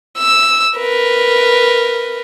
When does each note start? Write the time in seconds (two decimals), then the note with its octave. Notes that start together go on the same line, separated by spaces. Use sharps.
0.18 E6
0.78 A#4 B4